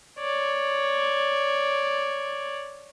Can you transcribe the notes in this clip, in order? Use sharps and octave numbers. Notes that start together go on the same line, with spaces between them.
C#5 D5